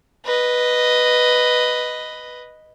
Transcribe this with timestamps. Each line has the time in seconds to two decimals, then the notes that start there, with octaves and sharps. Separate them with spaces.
0.25 B4 D#5